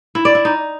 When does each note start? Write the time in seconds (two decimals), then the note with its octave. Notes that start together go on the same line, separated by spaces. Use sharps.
0.15 E4
0.25 D5
0.35 E4
0.45 D#4